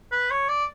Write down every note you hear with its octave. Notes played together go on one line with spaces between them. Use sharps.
B4
C#5
D5